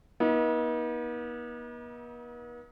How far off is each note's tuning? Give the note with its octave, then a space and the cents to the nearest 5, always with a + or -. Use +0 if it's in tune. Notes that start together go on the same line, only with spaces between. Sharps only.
B3 -45 D#4 +35